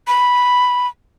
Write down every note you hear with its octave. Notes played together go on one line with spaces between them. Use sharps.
B5